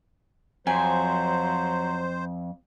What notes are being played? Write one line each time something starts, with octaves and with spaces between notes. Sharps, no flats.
F2 F#3 C5 G#5